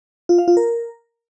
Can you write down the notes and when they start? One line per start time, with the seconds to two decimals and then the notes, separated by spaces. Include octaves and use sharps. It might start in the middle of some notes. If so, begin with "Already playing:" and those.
0.29 F4
0.38 F5
0.48 F4
0.57 A#4